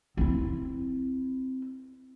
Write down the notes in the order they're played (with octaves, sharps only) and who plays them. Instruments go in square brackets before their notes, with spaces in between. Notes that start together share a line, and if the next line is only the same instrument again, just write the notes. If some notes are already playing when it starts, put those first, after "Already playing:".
[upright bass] C4 E4